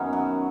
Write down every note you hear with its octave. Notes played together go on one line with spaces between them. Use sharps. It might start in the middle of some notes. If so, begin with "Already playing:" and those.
Already playing: F#2 D#3 B3 C#4 D#4
F#3